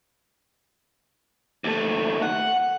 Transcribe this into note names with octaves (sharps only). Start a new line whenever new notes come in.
D#2 A3
F#5